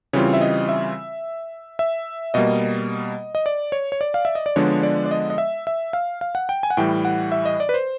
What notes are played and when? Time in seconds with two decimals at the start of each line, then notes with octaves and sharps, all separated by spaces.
0.13 C#3 E3 G3 C4 F4 C#5
0.34 E5
0.41 D#5
0.69 E5
1.79 E5
2.34 B2 G3 A#3 D#5
3.35 D#5
3.46 D5
3.72 C#5
3.92 C#5
4.01 D5
4.14 F5
4.25 E5
4.35 D#5
4.46 D5
4.56 D3 F3 G#3 B3 D4 C#5
4.83 D5
5.06 D5
5.11 D#5
5.30 D#5
5.38 E5
5.67 E5
5.93 F5
6.21 F5
6.35 F#5
6.49 G5
6.63 G#5
6.70 F#5
6.77 A2 E3 G3 G5
7.05 F#5
7.32 E5
7.45 D#5
7.60 D5
7.69 B4
7.74 C5